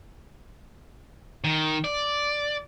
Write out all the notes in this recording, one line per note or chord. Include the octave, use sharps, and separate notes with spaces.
D#3
D5